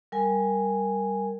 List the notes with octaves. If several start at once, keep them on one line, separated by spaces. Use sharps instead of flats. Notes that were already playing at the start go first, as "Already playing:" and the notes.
G3 A#4 G#5